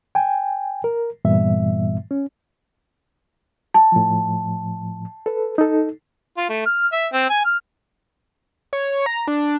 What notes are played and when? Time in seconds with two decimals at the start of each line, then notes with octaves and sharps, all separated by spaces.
0.15 G5 G#5
0.84 A#4
1.25 G2 A#2 E3 G3 B3 E5
2.11 C#4
3.74 A5
3.92 A2 F3
5.26 A4 B4
5.58 D#4 A4
6.37 F4
6.49 A3
6.66 F6
6.92 E5
7.13 C4
7.30 G#5
7.45 F6
8.73 C#5
9.06 A#5
9.28 D4